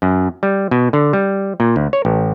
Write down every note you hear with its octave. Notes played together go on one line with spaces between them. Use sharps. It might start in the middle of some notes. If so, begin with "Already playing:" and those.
F#2
G3
B2
D3
G3
A#2
D2
C#5
A1